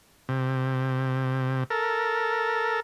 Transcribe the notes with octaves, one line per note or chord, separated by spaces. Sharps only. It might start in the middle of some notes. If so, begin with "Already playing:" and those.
C3
A4 A#4